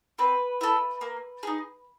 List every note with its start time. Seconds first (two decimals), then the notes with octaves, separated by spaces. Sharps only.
0.18 C4 B4
0.61 E4 A4
1.01 A#3
1.43 D#4 G#4